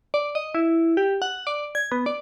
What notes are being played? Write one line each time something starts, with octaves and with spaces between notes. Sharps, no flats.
D5
D#5
E4
G4
F#5
D5
G#6
B3
D5